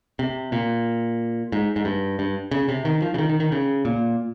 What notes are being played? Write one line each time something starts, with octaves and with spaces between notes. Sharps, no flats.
C3
A#2
G#2
G#2
G2
G2
C#3
C3
D#3
F3
C#3
D#3
D#3
D#3
C#3
A#2